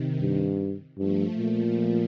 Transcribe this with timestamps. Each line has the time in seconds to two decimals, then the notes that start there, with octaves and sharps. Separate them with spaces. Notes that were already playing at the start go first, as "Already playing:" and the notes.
Already playing: C3 D#3
0.20 G2
0.98 G2 F3 A3
1.37 A#2